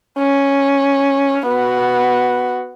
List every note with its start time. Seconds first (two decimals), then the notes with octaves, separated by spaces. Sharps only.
0.19 C#4
1.47 B3 F#4